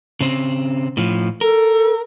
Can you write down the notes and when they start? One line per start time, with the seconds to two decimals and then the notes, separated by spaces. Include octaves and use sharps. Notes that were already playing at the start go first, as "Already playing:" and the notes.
0.20 C#3 C4
0.97 A2 F3
1.41 A4 A#4